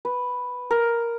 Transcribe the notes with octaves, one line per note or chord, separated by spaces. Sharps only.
B4
A#4